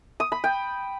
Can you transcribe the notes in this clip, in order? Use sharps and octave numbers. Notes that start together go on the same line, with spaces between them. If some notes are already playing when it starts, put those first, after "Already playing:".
D#6
B5
G5